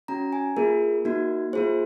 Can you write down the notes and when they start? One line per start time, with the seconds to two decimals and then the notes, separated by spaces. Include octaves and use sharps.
0.08 C#4 F#4 A#5
0.33 G#5
0.57 A#3 F4 G#4 A#4
1.05 A#3 D#4 F#4
1.53 A#3 F4 G#4 C5